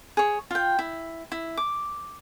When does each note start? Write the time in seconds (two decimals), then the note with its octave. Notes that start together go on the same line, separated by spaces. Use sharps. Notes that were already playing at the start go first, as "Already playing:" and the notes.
0.17 G#4 C#5
0.51 F4 G5
0.79 E4
1.32 E4
1.57 D6